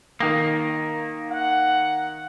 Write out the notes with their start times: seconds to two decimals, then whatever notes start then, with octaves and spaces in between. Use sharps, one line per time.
0.20 D#3 A#3 D#6
1.31 F#5